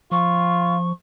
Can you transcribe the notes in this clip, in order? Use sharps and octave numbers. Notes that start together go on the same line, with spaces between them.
F3 F4 C#6